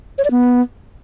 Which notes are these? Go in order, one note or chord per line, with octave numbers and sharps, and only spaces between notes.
C#5
D5
B3